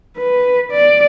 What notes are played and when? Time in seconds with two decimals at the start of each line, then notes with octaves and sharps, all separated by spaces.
0.17 B4
0.71 D5